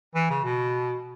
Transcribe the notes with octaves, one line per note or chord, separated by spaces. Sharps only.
E3
C#3
B2